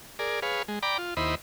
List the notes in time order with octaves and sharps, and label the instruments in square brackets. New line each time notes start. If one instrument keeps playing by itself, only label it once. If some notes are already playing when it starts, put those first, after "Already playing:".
[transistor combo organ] G#4 A#4 D5
G#4 B4 C#5 F5
G#3
D5 G5 A#5 B5 D6
F4
D#2 E4 C5 D#5 B5